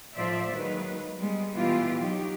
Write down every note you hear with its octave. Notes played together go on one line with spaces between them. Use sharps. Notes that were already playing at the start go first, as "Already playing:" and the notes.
A2 F3 C5 D5 E5
D#3 F#3 G#3 A#3 D#4 B4
G3 G#3 B3
B2 E3 F4 G4
F#3 D#4 G4